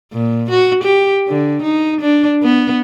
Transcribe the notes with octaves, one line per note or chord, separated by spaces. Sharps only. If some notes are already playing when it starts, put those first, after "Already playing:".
A#2
F#4
G4
D3
D#4
D4
B3